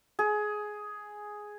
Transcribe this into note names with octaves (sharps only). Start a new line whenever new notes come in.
G#4